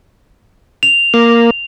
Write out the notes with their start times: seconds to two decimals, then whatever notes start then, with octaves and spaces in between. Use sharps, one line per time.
0.83 F7
1.14 A#3